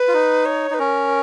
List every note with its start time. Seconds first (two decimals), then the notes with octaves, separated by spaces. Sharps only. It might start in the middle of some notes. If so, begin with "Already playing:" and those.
Already playing: B4
0.08 F4
0.14 D#4
0.46 C#5
0.71 D#4
0.74 B4
0.79 C#4 A#4